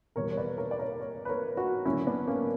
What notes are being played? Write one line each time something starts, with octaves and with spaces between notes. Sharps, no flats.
E2 B2 G3 A#4 C#5
C#5
B4 D5
A#4 C#5
D5
A#4 C#5
A#4 C#5
B4
A#4 C#5
D4 F#4
F#1 F#2 D3 C#4 E4
B3 D4
A#3 C#4